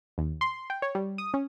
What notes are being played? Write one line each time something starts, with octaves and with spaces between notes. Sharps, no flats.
D#2
C6
G5
C#5
G3
D#6
C#4